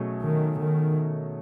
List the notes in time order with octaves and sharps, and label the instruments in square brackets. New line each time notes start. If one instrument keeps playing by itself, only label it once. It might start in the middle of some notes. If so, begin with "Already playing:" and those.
Already playing: [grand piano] B2 F#3 A3 C#4 G#4
[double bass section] D#3
D#3